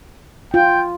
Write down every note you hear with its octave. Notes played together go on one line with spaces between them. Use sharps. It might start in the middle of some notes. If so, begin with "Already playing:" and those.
F4 G5